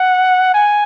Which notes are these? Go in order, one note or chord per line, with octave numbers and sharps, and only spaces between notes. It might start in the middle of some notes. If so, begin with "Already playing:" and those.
Already playing: F#5
G#5